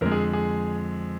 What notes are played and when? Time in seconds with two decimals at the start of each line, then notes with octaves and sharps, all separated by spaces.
0.01 F2 D3 G#3 A#4
0.12 G#4
0.33 G#4